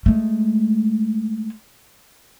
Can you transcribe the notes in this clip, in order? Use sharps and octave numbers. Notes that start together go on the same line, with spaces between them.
G#3 A3